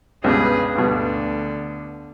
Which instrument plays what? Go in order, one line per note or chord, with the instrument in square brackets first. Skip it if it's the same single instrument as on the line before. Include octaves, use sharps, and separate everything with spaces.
[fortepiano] C#2 G2 B2 [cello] G#4 B4
[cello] D2 D3 [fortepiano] G2 B2